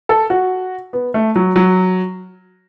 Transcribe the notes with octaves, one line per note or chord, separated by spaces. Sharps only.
A4
F#4
B3
A3
F#3
F#3